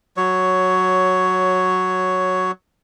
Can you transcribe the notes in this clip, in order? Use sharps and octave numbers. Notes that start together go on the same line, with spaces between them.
F#3 C#5